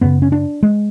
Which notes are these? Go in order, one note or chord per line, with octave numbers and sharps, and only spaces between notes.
F#2 C#3 B3
C#4
D4
G#3